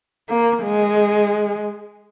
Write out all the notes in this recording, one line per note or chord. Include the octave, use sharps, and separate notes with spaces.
A#3
G#3